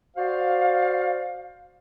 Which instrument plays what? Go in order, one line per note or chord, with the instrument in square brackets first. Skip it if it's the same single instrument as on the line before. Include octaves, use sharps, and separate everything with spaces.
[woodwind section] F#4 C5 D5 F5